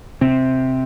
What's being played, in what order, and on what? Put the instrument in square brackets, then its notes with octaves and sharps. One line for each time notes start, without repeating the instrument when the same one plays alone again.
[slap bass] C3 C4